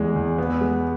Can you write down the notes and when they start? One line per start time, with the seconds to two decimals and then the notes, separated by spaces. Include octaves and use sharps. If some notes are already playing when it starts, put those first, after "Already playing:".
Already playing: E2 G#3
0.16 E2
0.38 B3
0.61 G#3